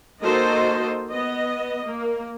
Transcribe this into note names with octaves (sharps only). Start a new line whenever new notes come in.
A#3 D#4 F#4 A4 C5 D#5
B3 D#5
A#3